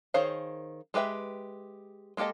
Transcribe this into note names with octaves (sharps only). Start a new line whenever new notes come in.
D#3 G#4 C5 C#5 F5
G#3 G4 B4 E5 G5
G#3 A#3 G4 A4 D#5